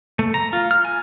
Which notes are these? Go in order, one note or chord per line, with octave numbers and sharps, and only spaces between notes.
A3
A#5
F4
F6
G#5